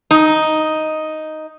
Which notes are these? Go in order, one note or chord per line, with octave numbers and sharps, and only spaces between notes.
D#4